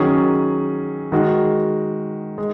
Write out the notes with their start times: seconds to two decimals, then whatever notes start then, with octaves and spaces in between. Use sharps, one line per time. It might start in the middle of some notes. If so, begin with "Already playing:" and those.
Already playing: D#3 F#3 C#4 G#4
1.12 D#3 G#3 F#4
2.38 G#3